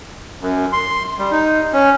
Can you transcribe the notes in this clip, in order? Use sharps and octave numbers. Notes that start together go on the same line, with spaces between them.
F#2
C6
G3
D#4
C#4